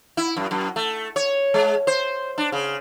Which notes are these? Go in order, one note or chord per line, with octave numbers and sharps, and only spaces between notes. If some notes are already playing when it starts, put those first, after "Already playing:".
E4
F#2
F#2
A3
C#5
G#3
C5
D4
C#3